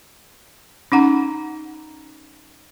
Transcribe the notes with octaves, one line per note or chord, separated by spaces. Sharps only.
C#4 D#4 F#5 A#5